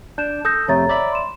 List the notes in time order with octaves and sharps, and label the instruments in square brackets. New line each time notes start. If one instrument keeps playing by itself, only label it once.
[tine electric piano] D4 [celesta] G6 E7
[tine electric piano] A4 [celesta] D#6 G6 A#6
[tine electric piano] F2 C3 A3 [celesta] C#5 A#5 A6
[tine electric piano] D5 E5 B5
[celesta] C6 E7